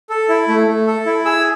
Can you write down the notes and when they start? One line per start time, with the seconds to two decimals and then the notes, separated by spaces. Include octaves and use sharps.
0.10 A4
0.29 E4
0.48 A3
0.67 A3
0.87 A4
1.06 E4
1.25 G#4 E6